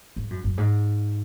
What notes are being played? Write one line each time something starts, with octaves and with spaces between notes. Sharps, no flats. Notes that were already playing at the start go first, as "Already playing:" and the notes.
G#2
F#2
F#2
G#2